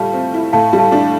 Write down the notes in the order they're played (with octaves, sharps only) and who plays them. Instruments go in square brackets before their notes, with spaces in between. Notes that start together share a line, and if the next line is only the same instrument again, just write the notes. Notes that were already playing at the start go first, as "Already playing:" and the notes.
Already playing: [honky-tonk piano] A2 G3 F4 [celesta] F5 A5
[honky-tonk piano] C4
E4
[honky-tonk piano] A2 [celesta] F5 A5
[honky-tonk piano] G3
[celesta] F5 A5
[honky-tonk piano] D4